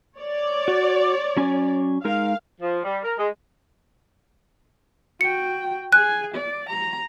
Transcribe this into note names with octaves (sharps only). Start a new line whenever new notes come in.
C#5 D5
F#4
F#3 C#4 G#5
G#3 D#4 A#4 F5
F3
G3
A#4
G#3
F#4 G5 C#7
G#4 G#5 F#6
D5
A#5